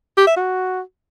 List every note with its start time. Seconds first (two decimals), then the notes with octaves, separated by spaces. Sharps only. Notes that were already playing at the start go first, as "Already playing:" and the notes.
0.18 G4
0.27 E5
0.37 F#4